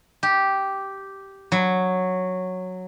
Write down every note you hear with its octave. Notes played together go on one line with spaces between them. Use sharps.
G4
F#3